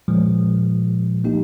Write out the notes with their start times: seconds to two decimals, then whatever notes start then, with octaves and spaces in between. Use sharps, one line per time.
0.08 A#2 F3 G#3
1.24 F3 A#3 D#4 G4